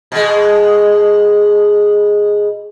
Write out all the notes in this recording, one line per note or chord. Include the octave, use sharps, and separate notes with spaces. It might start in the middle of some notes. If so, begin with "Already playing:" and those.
B2 G#3